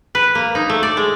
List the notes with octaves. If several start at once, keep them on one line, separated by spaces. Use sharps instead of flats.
B4
A#3
D#4
A3
D5
G#3